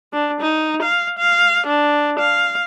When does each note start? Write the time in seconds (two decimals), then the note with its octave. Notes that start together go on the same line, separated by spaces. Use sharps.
0.13 D4
0.41 D#4
0.83 F5
1.19 F5
1.67 D4
2.19 F5